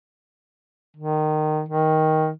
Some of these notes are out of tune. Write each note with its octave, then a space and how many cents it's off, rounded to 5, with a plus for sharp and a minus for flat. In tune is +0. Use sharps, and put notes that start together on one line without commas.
D#3 -20
D#3 +10